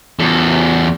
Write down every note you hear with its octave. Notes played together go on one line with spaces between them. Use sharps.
E2 A4